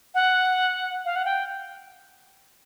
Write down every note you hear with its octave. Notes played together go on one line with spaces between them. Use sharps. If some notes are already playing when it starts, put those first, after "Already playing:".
F#5
F5
F#5
G5